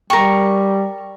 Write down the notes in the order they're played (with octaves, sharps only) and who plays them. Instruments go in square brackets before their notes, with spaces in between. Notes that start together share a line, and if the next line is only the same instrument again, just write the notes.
[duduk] G3 [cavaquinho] A#4 C#6 [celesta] G5